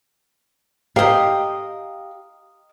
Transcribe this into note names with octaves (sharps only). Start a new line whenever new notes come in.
G4 A#4 D#5 F5